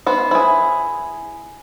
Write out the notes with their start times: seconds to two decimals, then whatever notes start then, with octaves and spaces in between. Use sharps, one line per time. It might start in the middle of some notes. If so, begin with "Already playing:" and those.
0.07 B3 C5
0.31 E4 G#4